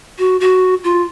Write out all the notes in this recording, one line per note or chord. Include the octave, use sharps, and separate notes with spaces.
F#4
F#4
F4